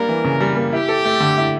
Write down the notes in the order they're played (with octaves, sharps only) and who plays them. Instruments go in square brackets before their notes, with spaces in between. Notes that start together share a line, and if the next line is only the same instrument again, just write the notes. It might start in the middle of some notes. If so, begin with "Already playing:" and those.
Already playing: [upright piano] G3 A#3 D4 [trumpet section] A#4
[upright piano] E3
C#3
G3
A#3
[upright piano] E4 [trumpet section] G4
[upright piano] A4
A3
D3
E4